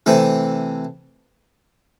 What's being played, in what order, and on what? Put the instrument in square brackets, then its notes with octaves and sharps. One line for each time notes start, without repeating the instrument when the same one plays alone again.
[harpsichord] C3 E3 A3